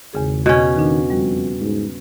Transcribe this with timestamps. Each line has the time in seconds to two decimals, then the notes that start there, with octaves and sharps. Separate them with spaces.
0.13 G#1 E2 C#3 G#4
0.46 B2 C#4
0.76 D#3 D4 F#4
1.10 F2 G3 F#4
1.61 G#2